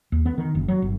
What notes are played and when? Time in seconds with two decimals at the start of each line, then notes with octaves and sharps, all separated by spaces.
0.12 D#2
0.26 B3
0.38 D#3
0.55 F#1
0.68 F#3
0.82 G1